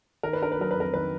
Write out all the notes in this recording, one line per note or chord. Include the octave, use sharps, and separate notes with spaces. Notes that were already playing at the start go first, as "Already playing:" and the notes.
D#3 A#4
B4
D4 A#4
B4
F#3 A#4
B4
F2 A#4
D#3 B4